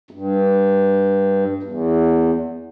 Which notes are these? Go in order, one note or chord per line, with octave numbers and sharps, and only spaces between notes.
G2
E2